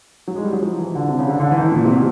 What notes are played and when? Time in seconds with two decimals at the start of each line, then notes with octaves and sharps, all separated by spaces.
0.28 F#3
0.36 G#3
0.44 G3
0.53 F#3
0.62 F3
0.78 E3
0.95 D3
1.09 C3
1.19 C#3
1.29 D3
1.40 D3
1.51 E3
1.57 D#3
1.61 E3
1.72 A#2
1.85 C3
1.95 B2